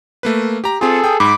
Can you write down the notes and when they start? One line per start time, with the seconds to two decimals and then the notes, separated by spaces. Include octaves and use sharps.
0.23 A3 A#3 B4
0.64 G4 A#5
0.81 C4 F4 G#4 A4
1.04 G5 D#6
1.20 G#2 B5 D6